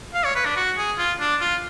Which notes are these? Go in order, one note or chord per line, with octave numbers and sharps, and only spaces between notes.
F5
C#5
B4
D4
F#4
G#4
F4
D4
F4